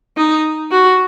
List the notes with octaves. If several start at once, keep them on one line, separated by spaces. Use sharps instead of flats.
D#4
F#4